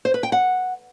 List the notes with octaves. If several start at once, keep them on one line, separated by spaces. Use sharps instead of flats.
C5
B4
G5
F#5